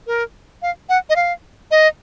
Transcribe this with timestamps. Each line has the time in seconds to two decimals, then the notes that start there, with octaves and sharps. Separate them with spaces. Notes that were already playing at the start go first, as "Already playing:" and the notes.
0.07 A#4
0.62 F5
0.89 F#5
1.10 D#5
1.16 F5
1.71 D#5